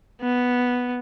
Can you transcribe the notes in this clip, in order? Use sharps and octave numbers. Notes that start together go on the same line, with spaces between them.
B3